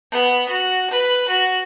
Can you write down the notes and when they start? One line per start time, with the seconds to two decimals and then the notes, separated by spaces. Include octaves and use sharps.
0.11 B3
0.49 F#4
0.91 B4
1.28 F#4